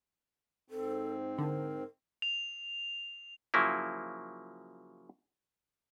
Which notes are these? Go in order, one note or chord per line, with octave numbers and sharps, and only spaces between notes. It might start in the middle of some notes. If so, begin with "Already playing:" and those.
G#2 C4 A4
D3 A#4
F7
C#3 F3 F#3 A#3 E4